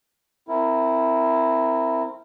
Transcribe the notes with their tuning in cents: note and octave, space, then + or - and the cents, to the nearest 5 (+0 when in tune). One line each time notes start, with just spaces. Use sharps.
C4 -5 E4 +0 A#4 -20